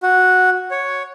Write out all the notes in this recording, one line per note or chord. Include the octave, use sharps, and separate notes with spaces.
F#4
C#5